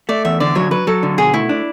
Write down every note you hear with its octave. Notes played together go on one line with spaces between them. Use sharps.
A3 D5
E2 E5
D3 D5
F#3 C#5
F#3 B4
F#3 A4
D3
B2 G#4
A3 E4
D4